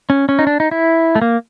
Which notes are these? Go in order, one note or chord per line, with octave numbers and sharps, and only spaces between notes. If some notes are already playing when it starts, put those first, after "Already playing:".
C#4
C#4
D#4
D4
D#4
E4
A3
A#3